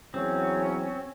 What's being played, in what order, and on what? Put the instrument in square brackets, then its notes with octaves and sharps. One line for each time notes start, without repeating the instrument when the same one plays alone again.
[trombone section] E2 F#3 [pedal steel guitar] C4 [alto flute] C#4